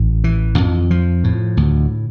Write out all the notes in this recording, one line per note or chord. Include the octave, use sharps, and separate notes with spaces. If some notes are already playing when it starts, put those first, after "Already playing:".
Already playing: A1
E3
F2
F3
A2
D2